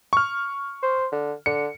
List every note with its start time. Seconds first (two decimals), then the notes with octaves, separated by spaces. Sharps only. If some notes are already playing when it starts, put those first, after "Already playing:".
0.13 C#6 F6
0.82 C5
1.12 D3
1.46 D3 C#7